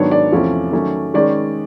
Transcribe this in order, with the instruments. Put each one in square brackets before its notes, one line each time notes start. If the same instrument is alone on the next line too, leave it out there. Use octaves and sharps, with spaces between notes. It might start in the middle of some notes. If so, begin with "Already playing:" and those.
Already playing: [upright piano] G#2 D#3 F#3 B3 D4 C#5
D5
E2 C3 F3 A3 C#4
D#3 F#3 A3 C#4
D#3 G#3 C#4 D5